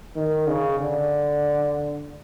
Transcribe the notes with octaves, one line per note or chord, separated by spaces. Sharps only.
D#3
C#3
D3